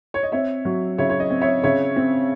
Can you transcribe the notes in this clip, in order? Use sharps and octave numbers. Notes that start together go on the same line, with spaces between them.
C#5
D#5
C4 C#5 E5
F#3
C#3 C#5 E5
C#5
D#5
C4
C#5 E5
C#3 C#5 E5
C4